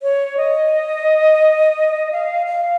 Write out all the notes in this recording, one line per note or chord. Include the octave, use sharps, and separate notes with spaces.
C#5
D#5
F5
F5